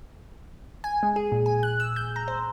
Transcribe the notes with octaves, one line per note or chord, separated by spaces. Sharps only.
G#5
G#3
G#4
A#2
G#5
F#6
E6
G6
A#5
C5